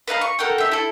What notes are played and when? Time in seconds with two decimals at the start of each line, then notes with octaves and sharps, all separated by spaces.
0.08 B4 D#5 F5 A#5
0.21 C#6
0.39 A4 A#4 F#5 G5
0.58 G4 E5
0.72 E4 A4